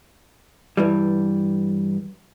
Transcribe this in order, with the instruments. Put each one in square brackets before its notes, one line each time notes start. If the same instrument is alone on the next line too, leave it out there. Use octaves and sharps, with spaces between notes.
[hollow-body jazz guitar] G2 E3 G3